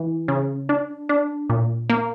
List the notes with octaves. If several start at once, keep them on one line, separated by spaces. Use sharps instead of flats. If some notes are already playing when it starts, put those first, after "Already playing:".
Already playing: E3
C#3
D4
D4
A#2
A#3